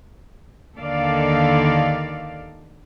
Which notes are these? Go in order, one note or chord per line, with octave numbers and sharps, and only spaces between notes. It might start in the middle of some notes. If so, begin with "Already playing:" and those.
D#2 D3 D#3 A4 D5 F5